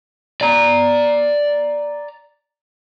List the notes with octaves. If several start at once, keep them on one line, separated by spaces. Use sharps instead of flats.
D5 A#5